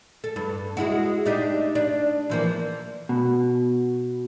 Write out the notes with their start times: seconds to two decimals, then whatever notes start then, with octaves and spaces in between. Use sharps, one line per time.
0.24 A4
0.36 G2
0.77 G#3 E4 F#4
1.25 D4 D#4 G4
1.75 D4
2.30 E3 F3 A#3
3.09 B2